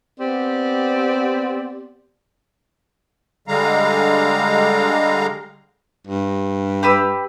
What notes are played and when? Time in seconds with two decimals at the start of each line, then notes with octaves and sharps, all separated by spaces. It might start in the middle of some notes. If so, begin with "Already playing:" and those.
0.21 B3 C4 G4 D5
3.48 D3 G3 G#3 F5 A#5
6.07 G2
6.83 G4 B4 E6